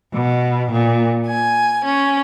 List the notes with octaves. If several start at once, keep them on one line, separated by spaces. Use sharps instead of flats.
B2
A#2
G#5
C#4